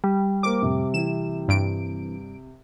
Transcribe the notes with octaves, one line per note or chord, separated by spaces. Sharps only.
G3
A#3 A#4 C5 D6
F2 A2 C3
E3 C4 E4 E7
G2 D7